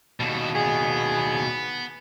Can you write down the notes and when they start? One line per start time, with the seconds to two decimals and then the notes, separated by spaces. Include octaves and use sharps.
0.20 D#2 B2 G3 A4
0.55 B3 G#4